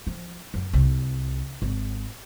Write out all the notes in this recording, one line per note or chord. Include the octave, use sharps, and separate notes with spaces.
F3
F#2
C2
G#1